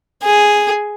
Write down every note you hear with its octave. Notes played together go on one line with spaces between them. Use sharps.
G#4